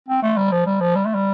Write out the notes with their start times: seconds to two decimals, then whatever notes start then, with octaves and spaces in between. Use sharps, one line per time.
0.09 C4
0.23 A3
0.37 G3
0.52 F3
0.66 G3
0.81 F3
0.95 G3
1.05 A3
1.15 G3